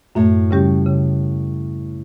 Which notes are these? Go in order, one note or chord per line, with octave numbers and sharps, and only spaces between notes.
F#2 A2
C#3 G3 C#4 G4
C#3